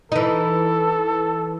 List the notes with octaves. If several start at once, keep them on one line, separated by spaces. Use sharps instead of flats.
E3 D#4 A4